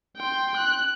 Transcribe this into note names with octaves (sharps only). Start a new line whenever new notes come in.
G5 C6
F#6